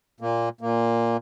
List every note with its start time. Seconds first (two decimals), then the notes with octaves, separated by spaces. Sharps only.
0.20 A#2 A#3
0.61 A#2 A#3